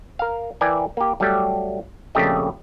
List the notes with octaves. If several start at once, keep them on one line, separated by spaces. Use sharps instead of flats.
A#4 F5
E3 A#4 D5 G5 G#5
A#3 G4
F#3 G3 A3 G4
A#1 F2 C#3 A3 G4 D#5